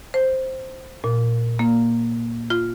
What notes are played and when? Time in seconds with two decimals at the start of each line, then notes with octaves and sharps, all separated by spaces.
0.14 C5
1.04 A#2
1.59 A#3
2.50 F4